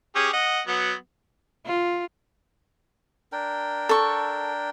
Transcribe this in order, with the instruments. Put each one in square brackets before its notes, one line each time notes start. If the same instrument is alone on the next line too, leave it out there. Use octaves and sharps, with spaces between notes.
[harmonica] C#4 G4 G#4
D#5 F#5
F#3 B3
[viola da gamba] F4
[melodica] D4 A#4 G5
[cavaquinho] A4 C#6